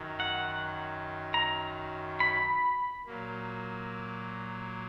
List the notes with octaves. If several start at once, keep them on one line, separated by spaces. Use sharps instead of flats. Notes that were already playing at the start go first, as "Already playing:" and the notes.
Already playing: F#2 D#3 F#3
F#5
A#5
B5
A#2 F#3 A#3